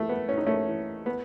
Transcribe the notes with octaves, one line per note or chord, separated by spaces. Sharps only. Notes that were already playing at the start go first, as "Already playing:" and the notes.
Already playing: E3 A3
B3
A2 C#4
D#4
A3 C#4
E3
B3